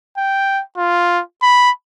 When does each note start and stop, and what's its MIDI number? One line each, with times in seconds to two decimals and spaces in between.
0.17 0.61 79
0.77 1.20 65
1.42 1.71 83